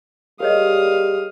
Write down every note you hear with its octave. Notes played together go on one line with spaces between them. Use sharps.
G3 G4 G#4 A#4 C#5 D#5 F5 D#6